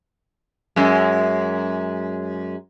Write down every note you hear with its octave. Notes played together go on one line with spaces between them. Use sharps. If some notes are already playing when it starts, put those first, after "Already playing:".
F#2 G#3